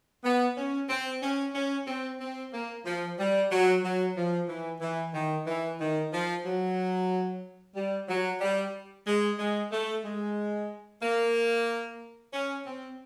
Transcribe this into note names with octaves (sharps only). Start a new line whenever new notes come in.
B3
C#4
C4
C#4
C#4
C4
C4
A#3
F3
G3
F#3
F#3
F3
E3
E3
D#3
E3
D#3
F3
F#3
G3
F#3
G3
G#3
G#3
A3
G#3
A#3
C#4
C4